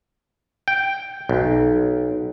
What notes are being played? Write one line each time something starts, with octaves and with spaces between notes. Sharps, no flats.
G5
B1